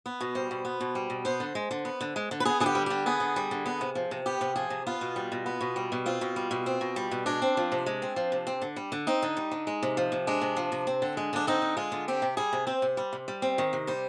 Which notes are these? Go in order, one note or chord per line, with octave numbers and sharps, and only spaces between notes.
B3
B2
G3 C5
B2
B3
B2
G3
B2
B3 C5
D3
G#3
D3
B3
D3
G#3
D3
B4
B3 G#4
D3 G#4
G4
G3
D3 G4
B3 G#4
D3
G3
D3
B3
C3
F3
C3
B3 G4
C3
F3 G#4
C3
B3 F4
B2
G3
B2
B3
B2
G3
B2
C4 F4
B2
G3
B2
C4
B2
G3
B2
G#3 D4
C4
F3
C3
G#3
C4
F3
C3
C4
D3
G3
D3
C4 D#4
D3
G3
D3
G#3
C3
F3
C3
G#3 D4
C3
F3
C3
C4
D3
G#3
D3 D4
C4 D#4
D3
G#3 F4
D3
C4 G4
C3
G3 G#4
C3
C4 C5
C3
G3
C3
G3
C4
D#3
C3
G3 C5